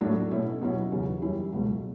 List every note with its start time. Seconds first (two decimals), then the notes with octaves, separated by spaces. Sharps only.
0.01 A2 F#3 A3 D4
0.31 B2 A3 C#4 E4
0.61 B2 F#3 C#4 E4
0.91 E2 C#3 F#3 B3
1.22 F#2 E3 G3 C#4 E4
1.52 C#2 B2 F#3 A3